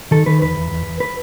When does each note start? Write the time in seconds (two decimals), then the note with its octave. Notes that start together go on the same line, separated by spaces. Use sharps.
0.11 D#3 A4
0.26 D#3 B4
0.41 E2 B4
0.57 E2
0.71 E2
0.86 E2
1.00 B4